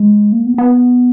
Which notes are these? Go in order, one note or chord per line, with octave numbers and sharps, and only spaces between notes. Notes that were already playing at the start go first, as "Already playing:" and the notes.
Already playing: G#3
A#3
B3
B3